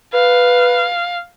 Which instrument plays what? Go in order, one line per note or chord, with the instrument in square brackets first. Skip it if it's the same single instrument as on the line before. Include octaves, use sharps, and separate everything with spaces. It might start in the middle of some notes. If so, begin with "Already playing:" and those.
[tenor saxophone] B4 [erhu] F5